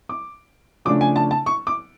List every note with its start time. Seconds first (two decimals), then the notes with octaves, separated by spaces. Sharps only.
0.09 D6
0.85 C#3 F3 A3 D4 D6
1.01 G#5
1.16 A5
1.31 A5
1.46 C#6
1.67 D6